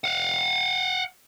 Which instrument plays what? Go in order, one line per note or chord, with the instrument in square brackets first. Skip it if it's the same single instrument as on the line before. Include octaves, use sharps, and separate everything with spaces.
[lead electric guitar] F5 F#5